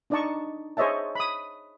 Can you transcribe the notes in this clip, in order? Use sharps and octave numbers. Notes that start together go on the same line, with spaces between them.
D4 D#4 D5 D#5 A5 C#6
G#4 C5 C#5 D#5 E5 A5
B5 D#6